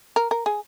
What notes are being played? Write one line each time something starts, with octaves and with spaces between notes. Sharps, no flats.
A#4
A#4
G#4